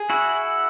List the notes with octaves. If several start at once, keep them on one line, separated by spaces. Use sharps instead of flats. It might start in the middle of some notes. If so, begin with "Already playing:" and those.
Already playing: G#4
E4 F#4